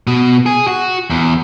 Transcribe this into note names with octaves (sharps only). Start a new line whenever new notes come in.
B2
G#4
F#4
E2